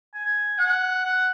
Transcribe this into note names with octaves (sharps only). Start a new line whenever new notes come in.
G#5
F#5
F#5